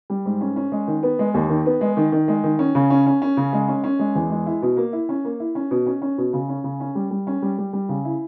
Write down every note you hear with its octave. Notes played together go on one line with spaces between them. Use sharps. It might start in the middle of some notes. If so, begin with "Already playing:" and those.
G3
G#2
C#4
C#4
G#3
D#3
B3
G#3
D#2
D#3
B3
G#3
D#3
D#3
G#3
D#3
C#4
C#3
C#4
C#4
C#4
C#3
G#3
C#4
C#4
G#3
E2
G#3
E4
B2
A#3
E4
C#4
A#3
E4
C#4
B2
C#4
C#4
B2
C#3
C#4
C#3
C#4
G3
G3
C#4
G3
G3
G3
C#3
E4